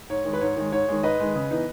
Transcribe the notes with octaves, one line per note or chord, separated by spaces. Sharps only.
G#2 C#5
D#3 G#3
B4
G#2 C#5
D#3 G#3
G#2 C#5
D#3 G#3
G#2 B4 D#5
D#3 G#3
C#3
E3 B3 D#4